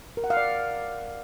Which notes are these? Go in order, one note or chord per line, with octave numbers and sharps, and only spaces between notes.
A#4
F#5
F5
D5